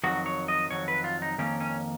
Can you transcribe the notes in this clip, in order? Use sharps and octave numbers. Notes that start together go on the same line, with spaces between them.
F2 D#3 F#3 F#4
C#5
D#5
F2 D#3 F#3 C#5
B4
F4
D#4
F2 D#3 A#3 C#4
C#4